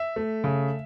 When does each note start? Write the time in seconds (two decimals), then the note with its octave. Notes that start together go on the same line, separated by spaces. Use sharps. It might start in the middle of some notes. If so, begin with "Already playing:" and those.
Already playing: E5
0.16 A3
0.44 C#3